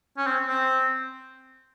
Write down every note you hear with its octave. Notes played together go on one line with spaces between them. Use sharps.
C#4
C4
C4